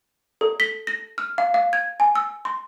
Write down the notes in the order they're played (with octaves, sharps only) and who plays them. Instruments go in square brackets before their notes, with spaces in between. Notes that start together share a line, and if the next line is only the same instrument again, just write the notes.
[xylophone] A4
B6
A#6
F6
F5
F5
G#6
G#5
E6
C6